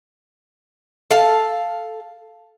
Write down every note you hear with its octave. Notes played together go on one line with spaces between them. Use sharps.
A4 F5 A5